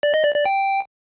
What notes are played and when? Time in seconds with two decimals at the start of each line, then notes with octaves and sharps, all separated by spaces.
0.03 D5
0.14 D#5
0.24 D5
0.35 D5
0.46 G5